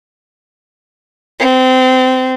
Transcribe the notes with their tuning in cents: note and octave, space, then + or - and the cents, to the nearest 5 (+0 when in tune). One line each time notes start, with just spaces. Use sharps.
C4 -25